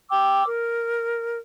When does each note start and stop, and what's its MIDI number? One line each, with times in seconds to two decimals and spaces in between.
0.10 0.46 79
0.10 0.46 86
0.10 0.46 88
0.46 1.37 70